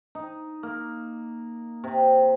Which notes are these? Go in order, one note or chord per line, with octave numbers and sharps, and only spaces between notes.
D#4
A#3
C3